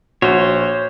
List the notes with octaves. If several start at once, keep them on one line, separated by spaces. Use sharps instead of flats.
A#1 F#4 C5 C#5